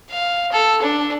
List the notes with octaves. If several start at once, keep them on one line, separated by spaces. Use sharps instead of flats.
F5
A4
D4